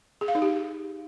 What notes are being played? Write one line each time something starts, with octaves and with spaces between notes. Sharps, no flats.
G#4
F5
D#4
G4